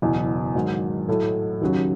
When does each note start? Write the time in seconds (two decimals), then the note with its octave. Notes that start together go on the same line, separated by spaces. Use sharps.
0.02 F#1 E2 B2
0.55 G#2 D#3 F#3
1.08 A2 F#3 A3
1.62 D#2 C#3 F#3